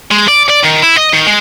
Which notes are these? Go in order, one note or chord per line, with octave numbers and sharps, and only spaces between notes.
G#3
D5
D5
D#3
E4
D#5
D#3
G#3